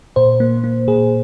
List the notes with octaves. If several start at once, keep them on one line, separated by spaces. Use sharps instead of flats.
A#2 C5
A#3
A#3
A#2 G#4